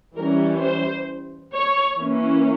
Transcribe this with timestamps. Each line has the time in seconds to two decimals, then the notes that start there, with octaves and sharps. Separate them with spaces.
0.16 E3 G3 C#4 A#4
0.61 C5
1.54 C#5
1.99 E3 A#3 C#4